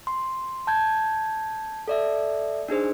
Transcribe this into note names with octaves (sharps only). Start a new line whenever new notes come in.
C6
A5 G6 G#6
A4 D5 E5
D4 D#4 G#4 C5